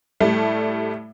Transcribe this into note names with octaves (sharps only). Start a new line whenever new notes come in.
A2 G3 A3